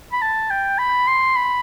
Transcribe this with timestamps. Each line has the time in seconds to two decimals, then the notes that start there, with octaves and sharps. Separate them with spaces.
0.13 B5
0.22 A5
0.50 G5
0.79 B5
1.08 C6
1.36 B5